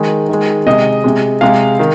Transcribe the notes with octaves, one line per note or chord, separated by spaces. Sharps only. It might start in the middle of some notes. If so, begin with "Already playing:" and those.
Already playing: D#3 G#3
D#3 G#3
C3 G#3 D#5
C3 G#3
C3 G#3 F5
D#3